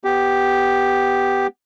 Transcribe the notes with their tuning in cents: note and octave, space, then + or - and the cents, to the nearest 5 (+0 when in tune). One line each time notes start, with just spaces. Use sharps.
B3 +0 G4 +0